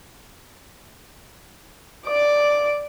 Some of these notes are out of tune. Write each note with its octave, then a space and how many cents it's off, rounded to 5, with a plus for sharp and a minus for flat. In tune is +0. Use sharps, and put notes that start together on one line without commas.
D5 +0 D6 +0